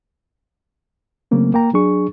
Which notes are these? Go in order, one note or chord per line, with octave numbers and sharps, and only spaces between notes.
C#3 F#3 A3 A#3 C4
A#3 G5 A#5
F#3 D4 G#4 C#6